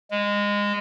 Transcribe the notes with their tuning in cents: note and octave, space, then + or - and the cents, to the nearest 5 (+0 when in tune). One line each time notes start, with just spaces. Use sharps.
G#3 -20